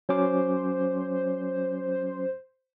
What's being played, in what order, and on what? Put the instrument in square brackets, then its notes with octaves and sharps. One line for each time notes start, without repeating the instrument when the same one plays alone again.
[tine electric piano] F#3 C#4 D6 [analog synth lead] C5